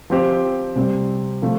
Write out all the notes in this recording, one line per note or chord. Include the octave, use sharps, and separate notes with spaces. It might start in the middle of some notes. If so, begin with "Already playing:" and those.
F3 C4 G4 C5
C3 G3 C4
C3 F3 A3